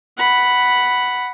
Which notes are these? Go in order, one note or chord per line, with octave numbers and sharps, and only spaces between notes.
F#5 B5